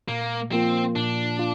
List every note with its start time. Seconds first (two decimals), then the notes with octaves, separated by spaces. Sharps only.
0.08 A#2 A#3
0.52 F3 A#3 C4 F4
0.95 A#2 D4
1.39 F4